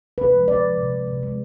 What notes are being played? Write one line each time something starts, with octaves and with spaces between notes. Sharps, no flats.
C3 B4
F3 G#3
C3 D5
F3 G#3
C3
G#3
C3
G#3